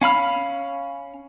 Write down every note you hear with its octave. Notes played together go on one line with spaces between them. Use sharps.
C#4 F5 B5 F6